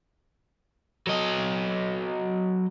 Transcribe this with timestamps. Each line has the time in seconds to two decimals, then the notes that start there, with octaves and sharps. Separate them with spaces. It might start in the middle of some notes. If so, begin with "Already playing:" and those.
1.07 F#3 D#5